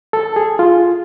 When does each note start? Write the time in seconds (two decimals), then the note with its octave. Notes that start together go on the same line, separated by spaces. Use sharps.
0.13 A4
0.36 G#4
0.59 F4